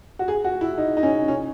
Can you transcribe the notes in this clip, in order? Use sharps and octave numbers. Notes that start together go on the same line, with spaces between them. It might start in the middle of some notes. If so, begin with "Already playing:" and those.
F#4
G#4
F#4
E4
D#4
D#4
C#4
C#4